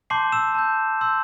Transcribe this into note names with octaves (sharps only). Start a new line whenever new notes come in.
A5 C6 D6 G6 C7
E6 E7
A5 E6 G6
C6 E6 G6